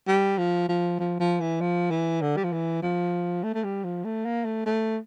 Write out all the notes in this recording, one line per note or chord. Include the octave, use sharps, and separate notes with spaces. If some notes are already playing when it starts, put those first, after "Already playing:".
G3
F3
F3
F3
F3
E3
F3
E3
D3
G3
F3
E3
F3
A3
A3
G3
F3
A3
A#3
A3
A3